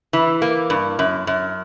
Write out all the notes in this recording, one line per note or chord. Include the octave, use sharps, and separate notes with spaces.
E3
A#3
G2
F#2
F#2